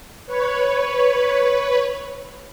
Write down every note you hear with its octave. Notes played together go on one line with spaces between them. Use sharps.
B4 C#5